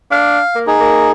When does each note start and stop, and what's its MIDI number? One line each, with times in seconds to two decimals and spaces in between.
0.11 0.39 62
0.11 0.59 77
0.55 0.75 58
0.67 1.12 63
0.67 1.12 68
0.80 1.11 58